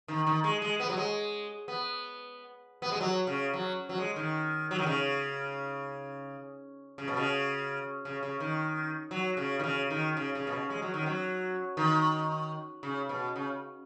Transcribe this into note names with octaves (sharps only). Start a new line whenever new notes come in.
D#3
D#3
G#3
G#3
B3
F#3
G#3
B3
B3
G#3
F#3
C#3
F#3
F#3
G#3
D#3
F#3
D#3
C#3
C#3
B2
C#3
C#3
C#3
D#3
F#3
C#3
D#3
C#3
D#3
C#3
C#3
B2
C#3
G#3
F#3
D#3
F#3
D#3
C#3
B2
C#3